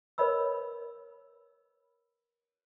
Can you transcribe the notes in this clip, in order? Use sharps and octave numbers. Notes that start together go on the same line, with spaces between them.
A#4 B4 C#5 D#5 B5 E6